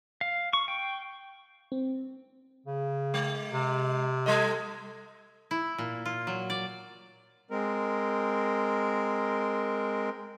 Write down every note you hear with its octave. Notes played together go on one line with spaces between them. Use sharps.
F5
C#6
G5
C4
C#3
G#3
C3
G3 A4 D#5
E4
A#2
F4
F#3
D5
G#3 C4 A#4